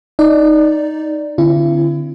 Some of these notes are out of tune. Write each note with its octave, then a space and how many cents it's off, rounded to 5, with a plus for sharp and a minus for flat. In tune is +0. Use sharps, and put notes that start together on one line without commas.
D#4 +0 D5 +0
D3 +0 C4 +0 E4 +40